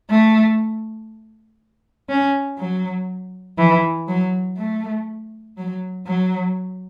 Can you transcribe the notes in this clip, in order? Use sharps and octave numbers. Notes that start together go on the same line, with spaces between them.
A3
C#4
F#3
E3
F#3
A3
F#3
F#3